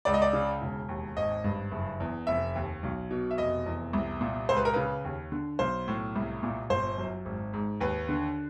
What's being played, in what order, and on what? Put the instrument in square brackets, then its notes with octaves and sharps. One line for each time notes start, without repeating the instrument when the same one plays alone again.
[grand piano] C#2 D5
D#5
D5
C#3
E1
D#2
G#1 D#5
G2
F#1
E2
F1 E5
D#2
B1
B2
E5
F1 D#5
E2
C2
A#2
C#2 C5
B4
A#4
C#3 B4
D#2
D3
B1 C5
A2
C2
A#2
G1 C5
F#2
G#1
G#2
D#2 B4
D3